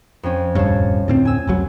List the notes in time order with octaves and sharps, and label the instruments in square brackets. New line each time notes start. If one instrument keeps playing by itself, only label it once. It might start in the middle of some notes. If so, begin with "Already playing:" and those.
[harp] F2 C#4
[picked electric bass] D#1 G2 [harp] C#5 F5 A5
[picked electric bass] D2 A2 C4
[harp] G#5 E6
[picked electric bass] F1 C2 F#3